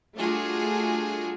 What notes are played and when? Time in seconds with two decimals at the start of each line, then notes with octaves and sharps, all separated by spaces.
0.17 G3 A3 D4 F4 F#4 G#4